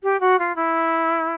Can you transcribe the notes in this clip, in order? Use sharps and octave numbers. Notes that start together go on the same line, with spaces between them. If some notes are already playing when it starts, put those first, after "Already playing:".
G4
F#4
F4
E4